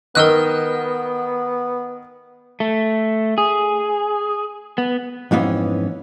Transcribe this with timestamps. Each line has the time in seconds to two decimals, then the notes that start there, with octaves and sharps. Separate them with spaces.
0.15 D#3 B3 A#4 D#5 E6 F#6
2.60 A3
3.38 G#4
4.78 B3
5.31 F2 G#2 E3 B3 C#4